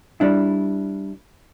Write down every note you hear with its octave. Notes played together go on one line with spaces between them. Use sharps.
G3 D4 E4